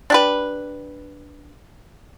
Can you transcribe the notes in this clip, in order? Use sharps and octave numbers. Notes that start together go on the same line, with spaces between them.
D4 G4 B4